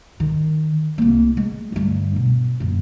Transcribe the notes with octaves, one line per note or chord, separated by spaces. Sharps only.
D#3
C2 A#3
G#3
D2 G2
B2
F#2 A#2